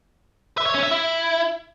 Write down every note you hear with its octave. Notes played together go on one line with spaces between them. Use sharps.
E5
C#5
C#4
E5
E4